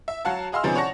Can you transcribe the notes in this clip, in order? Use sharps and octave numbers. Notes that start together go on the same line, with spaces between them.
E5
F#3 F#4 F5 F#5 A5
G#4 D#5 F5 C6 E6 F6
C3 F3 B3 C#4 D#4 G#4
C#5 D5 F#5 A5 C#6 A#6